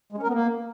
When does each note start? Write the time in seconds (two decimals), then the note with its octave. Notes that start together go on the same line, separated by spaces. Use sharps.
0.12 G#3
0.18 C#4
0.23 A#4
0.28 B3
0.33 A#3